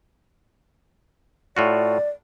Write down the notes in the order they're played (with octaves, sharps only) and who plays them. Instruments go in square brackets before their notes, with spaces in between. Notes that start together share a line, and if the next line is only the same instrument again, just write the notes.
[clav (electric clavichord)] A2 F4 F#4 [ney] D5